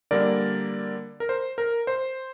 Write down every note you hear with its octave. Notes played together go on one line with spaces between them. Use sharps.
D3 G3 A#3 A#4 D5
A#4
C5
A#4
C5